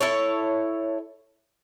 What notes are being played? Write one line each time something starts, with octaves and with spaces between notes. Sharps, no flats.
E4 A4 C#5